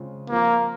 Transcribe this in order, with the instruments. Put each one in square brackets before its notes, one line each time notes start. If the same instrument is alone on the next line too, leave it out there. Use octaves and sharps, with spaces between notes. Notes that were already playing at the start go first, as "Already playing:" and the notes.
Already playing: [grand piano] C#3 G#3 C4 F4
[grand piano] F3 C4 F4 [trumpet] A#3